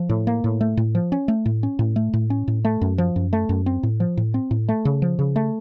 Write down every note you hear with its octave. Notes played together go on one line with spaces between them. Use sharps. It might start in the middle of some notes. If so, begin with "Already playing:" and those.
Already playing: F3
A2
A#3
A2
A3
A2
F3
C#4
A3
A2
C#4
A2
A3
A2
C#4
A2
A3
F#2
F3
F#2
A3
F#2
C4
A2
F3
A2
C4
A2
A3
C#3
F3
C#3
A3